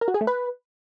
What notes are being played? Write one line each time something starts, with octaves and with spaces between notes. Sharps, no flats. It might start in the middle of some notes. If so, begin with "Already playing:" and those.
A#4
F#4
G#4
A3
B4